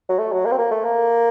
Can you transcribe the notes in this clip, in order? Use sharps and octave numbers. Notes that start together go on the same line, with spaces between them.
F#3
A3
F#3
A#3
C4
A#3
A3
A#3